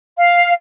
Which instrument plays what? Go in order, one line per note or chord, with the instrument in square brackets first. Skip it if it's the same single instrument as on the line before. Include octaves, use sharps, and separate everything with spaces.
[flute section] F5